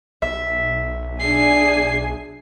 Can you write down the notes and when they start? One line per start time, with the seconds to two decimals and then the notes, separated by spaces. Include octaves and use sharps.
0.22 B1 E5
1.20 D4 G#4 G#5 C7